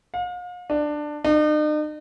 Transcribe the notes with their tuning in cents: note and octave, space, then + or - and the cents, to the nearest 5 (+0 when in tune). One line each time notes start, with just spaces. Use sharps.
F5 +40
D4 +15
D#4 -45